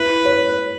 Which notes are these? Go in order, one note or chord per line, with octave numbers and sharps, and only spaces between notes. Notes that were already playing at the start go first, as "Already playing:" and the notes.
Already playing: E4 B4
C#5